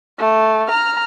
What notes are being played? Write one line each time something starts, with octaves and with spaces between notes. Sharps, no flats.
A3
A#5 F6